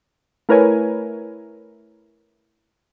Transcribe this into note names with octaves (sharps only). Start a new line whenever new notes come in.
A3 E4 A#4 B4 C#5 G#5